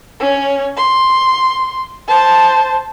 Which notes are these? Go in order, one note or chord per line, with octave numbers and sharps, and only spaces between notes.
C#4 C#5
C6
C5 A5